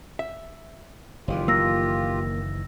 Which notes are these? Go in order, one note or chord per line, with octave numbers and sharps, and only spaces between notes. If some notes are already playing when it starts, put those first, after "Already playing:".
E5
F#1 D#3 E3 F4 G4
A#3 E6 A#6